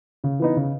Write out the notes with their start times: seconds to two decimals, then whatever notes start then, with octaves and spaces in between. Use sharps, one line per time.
0.24 C#3
0.40 E3 B3 D#4
0.56 C#3